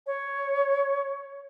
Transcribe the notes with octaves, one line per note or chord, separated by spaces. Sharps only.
C#5